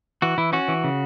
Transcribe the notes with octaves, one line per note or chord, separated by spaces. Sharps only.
E3 F#4
E3 E4
C#4 F#4
E3
C#3